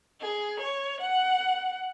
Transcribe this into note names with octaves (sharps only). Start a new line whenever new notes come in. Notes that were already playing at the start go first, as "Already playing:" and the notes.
G#4
C#5
F#5